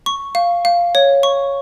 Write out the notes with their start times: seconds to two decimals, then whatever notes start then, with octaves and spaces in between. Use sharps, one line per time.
0.06 C#6
0.35 F5
0.65 F5
0.95 C#5
1.23 C#6